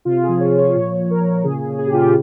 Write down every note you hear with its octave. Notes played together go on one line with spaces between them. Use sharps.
C3 F4
F3 G#4
C#5
F3
C#5
A#2 C#5
A#2
A#4
A#2
C#3 G#4
C#3
G#4
G4
C#3 F4
G4